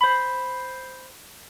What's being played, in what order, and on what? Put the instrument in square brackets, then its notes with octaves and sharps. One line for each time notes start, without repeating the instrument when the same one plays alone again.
[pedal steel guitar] C5 B5